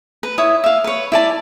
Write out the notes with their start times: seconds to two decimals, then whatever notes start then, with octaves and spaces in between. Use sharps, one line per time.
0.23 B4
0.38 E4 C#5 D#6
0.64 E5 F5
0.84 B4 C#5
1.12 E4 D5 A5